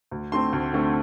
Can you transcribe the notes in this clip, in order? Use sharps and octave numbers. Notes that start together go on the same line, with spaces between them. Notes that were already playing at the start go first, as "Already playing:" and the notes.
D2
D3 A3 C4 C6
D2
D3 A3 C4